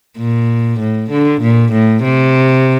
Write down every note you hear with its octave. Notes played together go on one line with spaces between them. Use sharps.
A#2
A2
D3
A#2
A2
C3